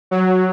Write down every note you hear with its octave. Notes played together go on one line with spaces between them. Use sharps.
F#3